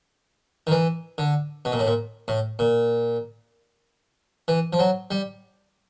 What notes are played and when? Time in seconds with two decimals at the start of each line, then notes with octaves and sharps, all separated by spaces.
0.67 D#3
0.71 E3
1.18 D3
1.65 B2
1.72 A#2
1.79 A2
1.87 A#2
2.28 A2
2.59 A#2
4.48 E3
4.73 F3
4.79 F#3
5.11 G3